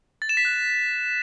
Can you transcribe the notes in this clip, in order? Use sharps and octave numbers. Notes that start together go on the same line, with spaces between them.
A6
E7
B6
F#6